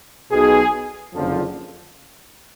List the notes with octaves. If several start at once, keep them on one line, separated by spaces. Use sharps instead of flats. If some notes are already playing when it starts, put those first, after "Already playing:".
B1 B2 G#4
F#1 F2 D3 F3